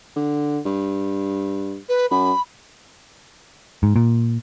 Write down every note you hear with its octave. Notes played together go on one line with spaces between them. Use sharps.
D3
G2
B4
F#2 B5
G#2
A#2